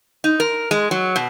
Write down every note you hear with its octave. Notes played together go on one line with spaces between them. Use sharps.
D#4
A#4
G#3
F#3
B2